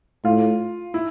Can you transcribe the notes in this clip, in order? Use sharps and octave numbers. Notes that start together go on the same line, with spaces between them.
A2 F4
E4